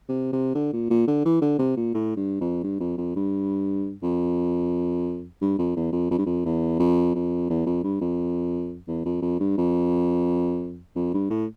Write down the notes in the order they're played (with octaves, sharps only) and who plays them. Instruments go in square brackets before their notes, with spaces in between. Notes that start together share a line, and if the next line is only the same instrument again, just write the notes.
[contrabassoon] C3
C3
D3
A#2
A#2
D3
E3
D3
C3
A#2
A2
G2
F2
G2
F2
F2
G2
F2
G2
F2
E2
F2
F2
G2
F2
E2
F2
F2
E2
F2
G2
F2
E2
F2
F2
G2
F2
F2
G2
A2